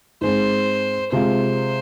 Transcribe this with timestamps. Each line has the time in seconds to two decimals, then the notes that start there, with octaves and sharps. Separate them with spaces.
0.21 G#2 G#3 C4 C5
1.12 C3 G#3 F4 C5